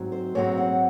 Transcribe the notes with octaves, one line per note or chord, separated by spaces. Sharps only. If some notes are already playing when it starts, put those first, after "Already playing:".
Already playing: G#2 F#3 C4
C5
G#2 F#3 C4 C#5
F#5